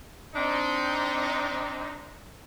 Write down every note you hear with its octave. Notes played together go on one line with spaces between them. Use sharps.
C4 D4 D#4